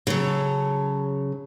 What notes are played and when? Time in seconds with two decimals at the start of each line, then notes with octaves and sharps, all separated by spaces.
0.07 C#3 F#3 A4 C#5